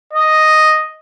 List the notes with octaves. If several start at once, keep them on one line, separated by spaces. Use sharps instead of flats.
D#5